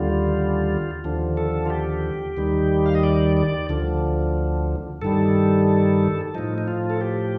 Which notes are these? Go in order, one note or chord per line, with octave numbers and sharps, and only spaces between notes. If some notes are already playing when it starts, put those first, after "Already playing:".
Already playing: D#2 D3 G3 F4
D#2 D3 F3
A4
F4
G4
D#2 D#3 G3
F5
D#5
D5
D5
D2 D3 F3
G2 D#3 G3 A4
A2 F3 D#4
D#4
F4
A4
G4